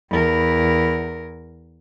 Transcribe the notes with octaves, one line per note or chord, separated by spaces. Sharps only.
E2 A#4